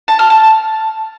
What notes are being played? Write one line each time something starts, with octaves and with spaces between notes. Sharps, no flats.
A5
F6
A5